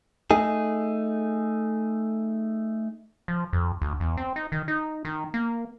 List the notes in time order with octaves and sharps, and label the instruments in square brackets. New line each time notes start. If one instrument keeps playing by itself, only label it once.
[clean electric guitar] A3 D#4 G#4
[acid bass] F3
F2
D2
E2
C4
D#4
D#3
D#4
D#3
A#3